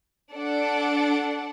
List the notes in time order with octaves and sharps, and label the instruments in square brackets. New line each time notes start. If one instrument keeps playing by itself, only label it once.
[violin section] D4 A4 D5 F#5